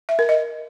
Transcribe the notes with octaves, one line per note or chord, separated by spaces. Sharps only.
E5
A#4
D#5